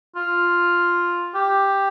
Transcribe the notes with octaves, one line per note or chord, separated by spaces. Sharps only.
F4
G4